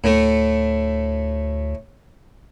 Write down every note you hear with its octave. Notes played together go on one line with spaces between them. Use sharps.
D2 A2 A3